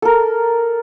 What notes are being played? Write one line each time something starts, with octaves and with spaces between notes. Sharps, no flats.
A4 A#4